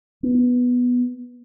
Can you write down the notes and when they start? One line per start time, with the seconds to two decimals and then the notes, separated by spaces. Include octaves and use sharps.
0.23 B3